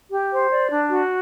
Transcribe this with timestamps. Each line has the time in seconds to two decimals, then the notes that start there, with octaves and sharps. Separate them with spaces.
0.11 G4
0.31 C5
0.51 D5
0.70 D4
0.90 F#4